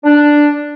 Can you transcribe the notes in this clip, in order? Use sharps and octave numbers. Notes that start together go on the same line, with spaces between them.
D4